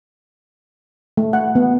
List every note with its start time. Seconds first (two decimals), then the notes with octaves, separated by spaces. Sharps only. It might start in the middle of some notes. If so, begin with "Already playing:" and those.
1.17 A3
1.33 F#5
1.55 B3